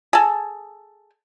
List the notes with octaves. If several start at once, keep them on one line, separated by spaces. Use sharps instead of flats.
G#4 A4